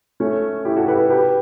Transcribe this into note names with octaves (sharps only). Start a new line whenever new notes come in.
A3 C#4
E4 G4
F#4 A4
G4 B4
G4 B4